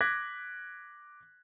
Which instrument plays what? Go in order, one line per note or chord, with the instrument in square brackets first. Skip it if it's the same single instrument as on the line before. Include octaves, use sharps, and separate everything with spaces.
[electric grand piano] D6 F#6 G#6 A#6 B6